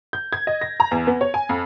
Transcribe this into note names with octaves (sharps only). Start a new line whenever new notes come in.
G6
G#6
D#5
A#6
A#5
E2
B3
C#5
G#5
F2